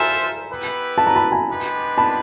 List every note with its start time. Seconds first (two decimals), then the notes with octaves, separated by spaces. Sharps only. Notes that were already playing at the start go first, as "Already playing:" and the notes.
Already playing: F4 A4 C5 E5 G#5 A#5
0.50 B3 E4 G4 B4
0.98 A5
1.07 A#5
1.16 A5 B5
1.32 G#5 A#5
1.48 G#3 B3 D4 G4 B4
1.98 A5 B5